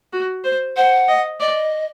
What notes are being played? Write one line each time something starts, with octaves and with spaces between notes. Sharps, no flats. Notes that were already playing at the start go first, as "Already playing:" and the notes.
F#4
C5
C5 F#5
D#5
D5 D#5